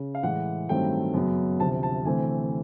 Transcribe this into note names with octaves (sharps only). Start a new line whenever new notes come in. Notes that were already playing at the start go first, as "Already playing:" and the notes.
Already playing: C#3
F5
A2 E3 G#3 F#5
G2 D#3 F#3 A3 C4 G5
F#2 C#3 F#3 B3
D2 C3 F3 A5
A5
D2 C3 E3 A3 C4 G#5